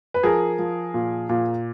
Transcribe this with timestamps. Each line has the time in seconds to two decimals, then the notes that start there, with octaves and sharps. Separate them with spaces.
0.14 B4
0.23 F3 G#4 A#4
0.59 F3
0.94 A#2
1.29 A#2